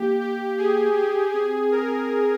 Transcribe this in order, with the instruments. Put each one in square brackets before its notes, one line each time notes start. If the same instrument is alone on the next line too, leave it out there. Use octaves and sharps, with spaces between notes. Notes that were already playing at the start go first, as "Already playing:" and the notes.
Already playing: [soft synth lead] A#3 [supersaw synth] G4
[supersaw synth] G4
G#4
G4
[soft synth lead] C4 [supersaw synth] G#4
[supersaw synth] A#4